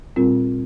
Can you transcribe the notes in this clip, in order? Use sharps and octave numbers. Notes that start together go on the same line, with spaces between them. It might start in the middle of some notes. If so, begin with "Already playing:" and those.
A#2 G3 C4 F4 A#4